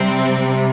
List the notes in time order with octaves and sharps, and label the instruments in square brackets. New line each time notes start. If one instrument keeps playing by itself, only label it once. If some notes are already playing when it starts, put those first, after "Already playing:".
Already playing: [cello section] C3 G3 C4